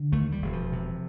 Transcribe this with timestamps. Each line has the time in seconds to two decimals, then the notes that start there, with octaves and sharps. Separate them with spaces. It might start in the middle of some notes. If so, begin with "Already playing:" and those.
Already playing: D3
0.12 D#2 A3
0.32 G3
0.42 E1
0.53 F3
0.72 C3